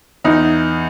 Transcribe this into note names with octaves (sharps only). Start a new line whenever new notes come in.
E2 D#4